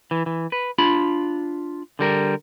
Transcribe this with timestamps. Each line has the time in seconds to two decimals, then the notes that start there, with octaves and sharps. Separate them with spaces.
0.11 E3
0.26 E3
0.52 B4
0.78 D4 F4 B5
1.99 D3 G3 A#4